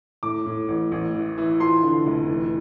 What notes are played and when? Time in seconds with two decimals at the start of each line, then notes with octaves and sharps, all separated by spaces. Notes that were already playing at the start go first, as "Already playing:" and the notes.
0.23 A2 D6
0.46 A2
0.68 A1
0.92 A1
1.15 E3
1.38 E3
1.60 F3 C6
1.83 D3
2.06 F1
2.29 E3